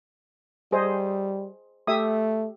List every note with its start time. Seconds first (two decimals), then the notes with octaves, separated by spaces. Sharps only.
0.72 G3 G#4 C5 D#5
1.87 A3 G4 E5 D#6